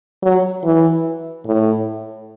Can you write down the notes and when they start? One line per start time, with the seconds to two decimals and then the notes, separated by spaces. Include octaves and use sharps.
0.23 F#3
0.64 E3
1.46 A2